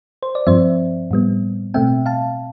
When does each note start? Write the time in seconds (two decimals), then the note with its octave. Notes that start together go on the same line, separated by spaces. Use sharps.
0.23 C5
0.35 D5
0.47 G2 F3 C4 C5 E5
1.11 A2 G3 B3
1.74 B2 A3 C4 E5 G5
2.06 F5 A5